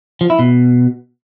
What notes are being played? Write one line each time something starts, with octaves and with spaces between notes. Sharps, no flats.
F3
E4
B2